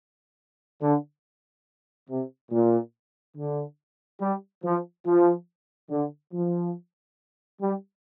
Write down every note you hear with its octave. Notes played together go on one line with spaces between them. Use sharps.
D3
C3
A#2
D3
G3
F3
F3
D3
F3
G3